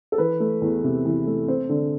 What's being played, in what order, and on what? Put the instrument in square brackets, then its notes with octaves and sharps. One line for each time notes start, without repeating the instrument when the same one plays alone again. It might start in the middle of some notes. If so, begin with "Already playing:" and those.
[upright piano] A4
E3 B4
A3
E2
C3
E3
A3
C4 C5
D3